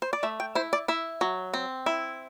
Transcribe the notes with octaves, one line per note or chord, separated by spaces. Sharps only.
C5
D5
A3 E5
G5
E4 C5
D5
E4 E5
F#3
C4
E4